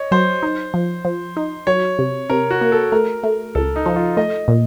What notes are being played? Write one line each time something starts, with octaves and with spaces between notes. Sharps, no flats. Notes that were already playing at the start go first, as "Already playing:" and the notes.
Already playing: C#5 D#5
F#3 C5
D#4
F3
F3
D#4
F#3 C#5
C3
C3 A#4
F#4
A#3
A4
A3 A#4
A3
C#2 A4
D#4
F3
F4
A3 D#5
A#2